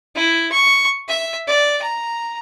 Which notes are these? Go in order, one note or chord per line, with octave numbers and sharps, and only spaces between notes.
E4
C#6
E5
D5
A#5